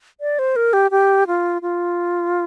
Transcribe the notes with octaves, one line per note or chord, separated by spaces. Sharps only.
D5
C5
A#4
G4
G4
F4
F4